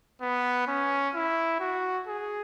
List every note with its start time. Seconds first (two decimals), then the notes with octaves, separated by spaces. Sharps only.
0.22 B3
0.68 C#4
1.14 E4
1.60 F#4
2.07 G#4